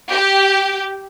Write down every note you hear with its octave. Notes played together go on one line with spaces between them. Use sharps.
G4